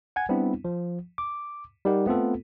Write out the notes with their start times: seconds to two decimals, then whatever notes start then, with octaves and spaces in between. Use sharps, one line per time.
0.16 F#5 G#5 G#6
0.29 G3 B3 C4 D4 E4
0.65 F3
1.18 D6
1.85 G3 D#4 G4 A#4 F#5
2.06 A3 B3 C4 F4 A4